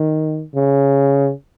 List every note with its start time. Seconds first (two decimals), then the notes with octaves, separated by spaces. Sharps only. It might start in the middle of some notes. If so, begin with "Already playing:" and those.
Already playing: D#3
0.55 C#3